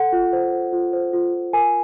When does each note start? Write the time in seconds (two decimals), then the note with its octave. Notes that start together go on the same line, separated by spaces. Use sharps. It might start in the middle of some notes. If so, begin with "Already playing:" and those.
Already playing: A4 F#5
0.12 F4
0.33 C5
0.53 C5
0.73 F4
0.93 C5
1.13 F4
1.33 F4
1.53 A#4 G#5